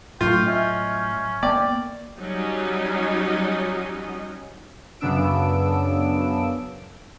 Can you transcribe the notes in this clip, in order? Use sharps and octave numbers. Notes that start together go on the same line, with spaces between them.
A2 F#3 A3 F4 G5 C#6
C#4 D#5 E5 G6
A#3 B3 D5 G5
F#3 G3 C#4 D#4 D#5
F#2 C#3 B3 D4 E6 D7